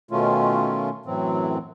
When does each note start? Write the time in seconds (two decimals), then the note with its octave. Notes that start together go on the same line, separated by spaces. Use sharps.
0.11 B2 D#3 A3 C#4 F4
1.06 F#2 A2 E3 F#3 C4